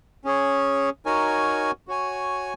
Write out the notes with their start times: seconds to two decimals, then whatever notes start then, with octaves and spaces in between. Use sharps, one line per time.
0.25 C#4 G#4 C#5
1.05 D#4 F#4 A#4 C#5 G#5
1.88 F#4 C#5 G#5